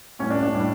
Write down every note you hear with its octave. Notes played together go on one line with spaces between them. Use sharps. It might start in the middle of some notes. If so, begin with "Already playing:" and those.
A2 G3 C#4
D4
D4
A2 G3